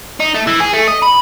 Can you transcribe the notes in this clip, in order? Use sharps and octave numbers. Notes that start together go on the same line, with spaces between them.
D#4
A3
E3
G#4
A3
D#5
B5